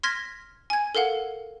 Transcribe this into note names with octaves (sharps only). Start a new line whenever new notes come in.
C6 F6 G#6 A#6 B6
G#5 G#6
A4 A#4 F5 F#5